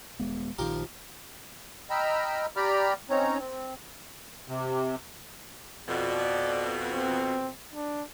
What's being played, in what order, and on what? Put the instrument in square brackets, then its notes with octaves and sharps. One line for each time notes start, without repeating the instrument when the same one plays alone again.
[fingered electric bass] D#1 G#3 B3
[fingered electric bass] A#1 D#3 [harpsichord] F3 G4 A#4
[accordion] D#5 G5 A#5 B5 E6 F6
G4 D5 G5 A#5 B5 F6
C4 C#4 D#4 C#5 A#5
C4
C3
[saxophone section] F2 B2 [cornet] D5
[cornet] C4
D4